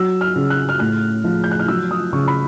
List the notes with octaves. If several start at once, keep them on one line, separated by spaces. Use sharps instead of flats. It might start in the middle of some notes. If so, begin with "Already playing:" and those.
Already playing: F#3 E6
F6
C#3
F#6
F6
A2 F#6
F3
G6
F#6
F6
F#3 E6
D#6
C#3 C#6
B5